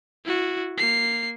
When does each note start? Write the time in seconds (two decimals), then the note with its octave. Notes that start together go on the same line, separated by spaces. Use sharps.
0.25 E4 F#4
0.78 A#3 C7